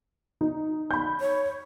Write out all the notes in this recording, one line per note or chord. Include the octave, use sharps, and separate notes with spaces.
D#4
B5 G6
C#5